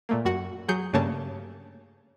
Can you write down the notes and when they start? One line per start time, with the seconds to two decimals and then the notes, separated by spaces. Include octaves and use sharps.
0.09 A#2 A3 A#3
0.25 F#2 F#4 F#5
0.68 F#3 G#4 G6 C#7
0.93 G2 C#3 A3 A#3 C#5 A5